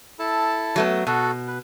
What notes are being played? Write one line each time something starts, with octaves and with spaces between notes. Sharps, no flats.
E4 A4 A5
F#3 A3 B3
B2 F#4 A4
B4